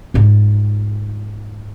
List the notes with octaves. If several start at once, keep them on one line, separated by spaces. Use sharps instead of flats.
G#2 F4